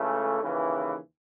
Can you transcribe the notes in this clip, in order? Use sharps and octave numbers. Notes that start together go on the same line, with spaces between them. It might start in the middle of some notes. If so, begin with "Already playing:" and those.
Already playing: C#2 C#3 E3 A3
D#2 C#3 E3